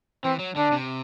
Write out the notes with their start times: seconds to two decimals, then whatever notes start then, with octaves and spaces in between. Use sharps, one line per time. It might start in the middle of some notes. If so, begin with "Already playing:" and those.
0.24 E3 C4
0.39 F#3
0.56 D3 D4
0.72 C3